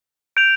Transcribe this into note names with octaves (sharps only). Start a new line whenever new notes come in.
G6 D7 F7